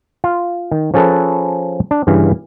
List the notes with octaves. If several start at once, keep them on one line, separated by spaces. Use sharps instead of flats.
F4
D#3
F3 C#4 G#4 A4 B4
D4
G2 C#3 E3 F5